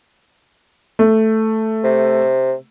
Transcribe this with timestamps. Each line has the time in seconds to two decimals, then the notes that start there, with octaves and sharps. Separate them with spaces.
0.99 A3
1.84 C3